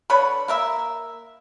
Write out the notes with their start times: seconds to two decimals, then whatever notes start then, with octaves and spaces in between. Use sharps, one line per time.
0.10 D3 B4 C#5 B5
0.48 A#3 A#4 E5